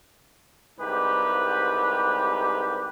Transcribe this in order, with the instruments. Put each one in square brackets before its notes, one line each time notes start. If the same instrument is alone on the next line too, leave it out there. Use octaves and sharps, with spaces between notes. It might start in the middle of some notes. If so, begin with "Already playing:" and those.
[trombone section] C2 G#2 G4 B4